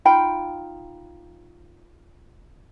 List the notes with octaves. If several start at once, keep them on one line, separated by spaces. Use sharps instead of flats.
D#4 F4 G5 B5